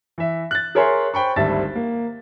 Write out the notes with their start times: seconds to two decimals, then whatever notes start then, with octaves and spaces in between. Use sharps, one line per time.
0.18 E3 E5
0.51 F#6 A6
0.75 G#4 A#4 C#5 E5 G#5 C6
1.14 C5 G5 B5 C#6
1.36 G#1 D2 G3 E5 A5 A6
1.75 A#3